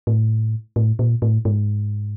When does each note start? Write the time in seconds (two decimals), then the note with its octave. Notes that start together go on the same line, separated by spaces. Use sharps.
0.07 A2
0.76 A2
0.99 A#2
1.22 A2
1.45 G#2